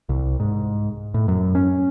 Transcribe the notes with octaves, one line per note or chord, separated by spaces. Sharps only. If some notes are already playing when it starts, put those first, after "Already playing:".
C2
G#2
A2
F#2
C#4